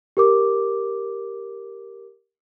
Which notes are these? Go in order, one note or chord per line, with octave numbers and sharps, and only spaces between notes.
G4 A#4 D6